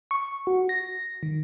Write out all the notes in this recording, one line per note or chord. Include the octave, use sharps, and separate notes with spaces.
C#6
F#4
A#6
D#3